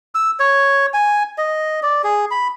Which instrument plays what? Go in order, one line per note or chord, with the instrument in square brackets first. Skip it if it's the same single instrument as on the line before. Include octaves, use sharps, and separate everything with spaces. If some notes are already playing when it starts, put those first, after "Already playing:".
[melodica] E6
C#5
G#5
D#5
D5
G#4
B5